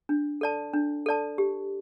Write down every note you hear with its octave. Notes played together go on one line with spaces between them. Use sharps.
D4
A4 D5 A5
D4
A4 D5 A5
G4